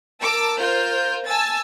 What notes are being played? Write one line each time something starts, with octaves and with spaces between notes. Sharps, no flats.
A#4 A5 D6 E6
F4 A#4 C5 F6 G6
G#5 A5 E6 A6